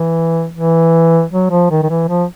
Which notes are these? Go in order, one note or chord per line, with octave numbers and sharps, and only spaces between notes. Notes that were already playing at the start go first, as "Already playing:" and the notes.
Already playing: E3
E3
F#3
F3
D#3
D#3
E3
F3